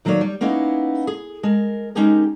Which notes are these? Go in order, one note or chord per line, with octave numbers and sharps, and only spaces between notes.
D#3 F#3 A#3 A4 C#5 D5
G3
A#3 B3 C#4 D#4 E4
G#4
G#3 A#4
G#3 C#4 D#4 G4 G#4 A#4